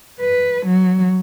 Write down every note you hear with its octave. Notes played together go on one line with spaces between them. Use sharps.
B4
F#3